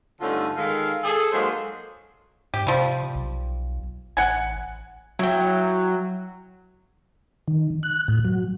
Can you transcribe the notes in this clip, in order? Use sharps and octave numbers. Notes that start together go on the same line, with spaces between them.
G2 D3 A3 C#4 D#4 F4
D#3 G#3 A4 A#4 F5
G#4 A4
F#3 G#3 A#3 D#4 A4 C5
G#2 G4
C3 F3 G3
B1
A1 F#5 G#5
F#3 E4 G5
D#3
F#6
A2
F#3